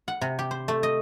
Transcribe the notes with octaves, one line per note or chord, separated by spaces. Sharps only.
F#5
C3
G4
C5
A3
D#5